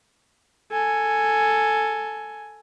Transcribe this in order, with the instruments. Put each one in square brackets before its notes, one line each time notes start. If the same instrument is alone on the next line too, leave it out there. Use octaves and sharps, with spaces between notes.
[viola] A4 G#5